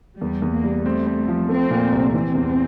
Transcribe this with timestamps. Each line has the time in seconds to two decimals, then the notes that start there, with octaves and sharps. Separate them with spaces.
0.20 E2 G3
0.42 E2
0.53 A#3
0.64 G3
0.85 A3 C4
1.06 C4
1.28 F3
1.49 A3 C4
1.70 A#2
1.92 C2
2.14 E3 C4
2.35 E2